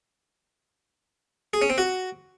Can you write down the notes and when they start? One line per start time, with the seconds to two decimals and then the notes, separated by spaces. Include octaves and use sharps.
1.53 G#4
1.62 C#4
1.70 C4
1.78 F#4